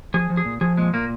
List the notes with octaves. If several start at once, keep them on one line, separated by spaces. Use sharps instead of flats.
F3 G#4
F3
G#4
A#2
F3 G#4
A#2 G#3
A#2 A#3